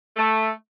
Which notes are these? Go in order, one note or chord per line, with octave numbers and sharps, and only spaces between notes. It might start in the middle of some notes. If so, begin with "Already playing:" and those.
A3